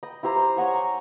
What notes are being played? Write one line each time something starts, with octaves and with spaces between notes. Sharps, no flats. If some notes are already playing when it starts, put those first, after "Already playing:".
D#5 G5 B5
E4 G4 C5 A#5
C5 D#5
C#5 D#5 F#5 G#5
A#5